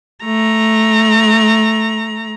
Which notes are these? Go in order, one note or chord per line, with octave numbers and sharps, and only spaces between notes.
A3 A#5